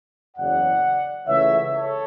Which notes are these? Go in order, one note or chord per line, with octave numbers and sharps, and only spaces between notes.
F#1 E2 C#3 F#3 D5 F#5
C#2 C#3 E3 A3 C#5 E5
A4 C#5